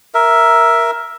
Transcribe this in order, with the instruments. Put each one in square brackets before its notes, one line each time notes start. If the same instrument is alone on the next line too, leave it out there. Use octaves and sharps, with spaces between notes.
[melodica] A#4 E5